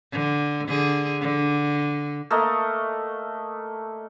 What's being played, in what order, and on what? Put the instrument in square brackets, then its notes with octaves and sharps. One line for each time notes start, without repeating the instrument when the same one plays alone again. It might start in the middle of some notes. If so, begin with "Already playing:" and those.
[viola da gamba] D3
D3 G#4
D3
[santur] A3 A#3 D#5